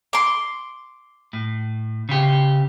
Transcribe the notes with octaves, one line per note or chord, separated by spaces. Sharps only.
C6 D6
A2
C#3 G4